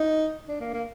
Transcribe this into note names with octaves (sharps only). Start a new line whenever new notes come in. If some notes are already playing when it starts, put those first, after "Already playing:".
Already playing: D#4
D4
A#3
A#3